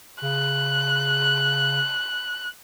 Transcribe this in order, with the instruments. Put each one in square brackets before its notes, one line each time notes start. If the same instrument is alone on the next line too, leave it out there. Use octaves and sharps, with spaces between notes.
[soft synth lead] C#3 [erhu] F#6